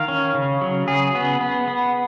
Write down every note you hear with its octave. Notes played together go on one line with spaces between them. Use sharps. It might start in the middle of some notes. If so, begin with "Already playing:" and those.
Already playing: D#3 F5
C#4
C#3
F#3
C#3 G#4
B3
B3
B3